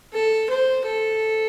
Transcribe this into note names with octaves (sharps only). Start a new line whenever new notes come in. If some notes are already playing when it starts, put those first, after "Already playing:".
A4
C5
A4